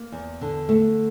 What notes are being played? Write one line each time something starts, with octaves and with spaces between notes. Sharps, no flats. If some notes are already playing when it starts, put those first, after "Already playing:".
Already playing: A#3
E2
D3
A3